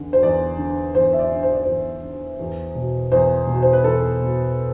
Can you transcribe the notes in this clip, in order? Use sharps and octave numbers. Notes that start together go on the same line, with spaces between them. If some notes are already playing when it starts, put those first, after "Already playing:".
Already playing: E2 D3
C5
E2 D5
D3
E2 C5
E5
D5
D3
C5
D5
E2 C5
D3
E2
B2
E2 C5
B2
C5
B4
E2 A4
B2